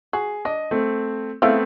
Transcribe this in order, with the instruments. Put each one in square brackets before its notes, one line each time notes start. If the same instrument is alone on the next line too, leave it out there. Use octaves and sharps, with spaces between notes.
[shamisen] F#4 [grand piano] G#4
[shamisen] D4 [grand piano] D#5
[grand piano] A3 C4
[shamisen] C#3 E4 F5 [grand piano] A3 B3 C4